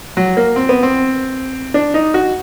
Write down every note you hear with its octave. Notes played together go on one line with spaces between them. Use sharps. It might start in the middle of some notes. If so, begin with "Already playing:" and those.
F#3
A#3
C4
B3
C4
D4
D#4
F#4